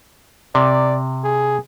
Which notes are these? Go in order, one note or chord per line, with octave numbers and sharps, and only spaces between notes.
C3 D5
G#4